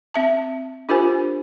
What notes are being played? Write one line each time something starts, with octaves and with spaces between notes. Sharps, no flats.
C4 E5 A5
D4 F4 G4 A#4 C5 G#5